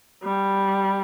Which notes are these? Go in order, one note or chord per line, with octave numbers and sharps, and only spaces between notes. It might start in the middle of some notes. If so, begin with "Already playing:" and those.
G3